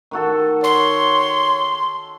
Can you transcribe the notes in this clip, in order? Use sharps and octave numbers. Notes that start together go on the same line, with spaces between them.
D#3 F#4 A4
C#5 C6